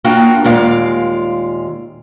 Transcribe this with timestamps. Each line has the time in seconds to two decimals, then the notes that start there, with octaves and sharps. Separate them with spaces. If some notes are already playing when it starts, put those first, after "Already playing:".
0.04 A#3 D4 F4 F#4 G5
0.44 D#2 A#2 G#3 F4 D5 F5